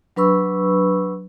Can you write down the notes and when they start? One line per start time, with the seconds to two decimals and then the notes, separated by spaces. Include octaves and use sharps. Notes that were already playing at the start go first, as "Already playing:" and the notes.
0.16 F#3 D4 B4 B5 C#6 E6